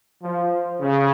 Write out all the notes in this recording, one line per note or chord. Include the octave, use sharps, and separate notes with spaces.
F3
C#3